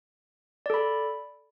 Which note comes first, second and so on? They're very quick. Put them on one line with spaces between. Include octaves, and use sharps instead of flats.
D5 A4 B5